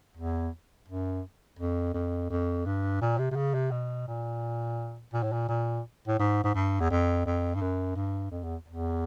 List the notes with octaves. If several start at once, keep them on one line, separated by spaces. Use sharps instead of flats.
E2
F#2
F2
F2
F2
G2
A#2
C3
C3
C#3
C3
B2
A#2
A#2
A2
A#2
A#2
A2
G#2
G#2
G2
E2
F2
F2
G2
F#2
G2
F2
E2
E2